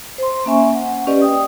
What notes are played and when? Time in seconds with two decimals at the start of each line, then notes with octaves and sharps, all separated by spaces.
0.18 C5 C6
0.46 A#3 C#4 E5 G#5 C#6
0.74 F#5
1.07 C#4 G4 B4 D5 D#5
1.22 G5 D#6